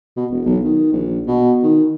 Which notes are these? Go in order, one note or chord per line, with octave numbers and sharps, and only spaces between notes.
B2
E1
B1
D#3
A#1
B2
D#3